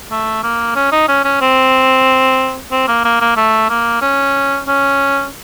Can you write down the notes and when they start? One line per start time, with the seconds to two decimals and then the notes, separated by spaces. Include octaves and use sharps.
0.11 A3
0.43 A#3
0.75 C#4
0.92 D#4
1.08 C#4
1.24 C#4
1.41 C4
2.72 C4
2.88 A#3
3.05 A#3
3.21 A#3
3.37 A3
3.69 A#3
4.01 C#4
4.68 C#4